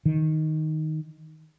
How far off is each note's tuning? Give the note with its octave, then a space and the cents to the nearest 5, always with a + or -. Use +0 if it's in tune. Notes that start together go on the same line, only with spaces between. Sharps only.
D#3 +5